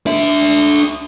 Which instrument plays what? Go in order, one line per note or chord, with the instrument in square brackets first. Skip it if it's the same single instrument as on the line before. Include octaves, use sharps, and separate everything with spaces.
[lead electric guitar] D4 E5